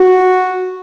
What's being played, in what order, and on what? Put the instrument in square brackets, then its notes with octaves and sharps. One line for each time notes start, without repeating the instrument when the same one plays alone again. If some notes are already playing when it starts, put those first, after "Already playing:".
Already playing: [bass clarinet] F#4